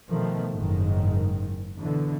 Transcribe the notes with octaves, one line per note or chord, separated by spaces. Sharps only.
B2 D#3 F3 A3
F#1 G#2 D#3
B2 D3 E3